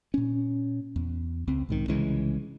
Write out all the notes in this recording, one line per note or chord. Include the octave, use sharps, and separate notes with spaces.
A#2 C#4
E2
C#2 C4
B1 G#2 D#3
C2 C#3 E3 G#3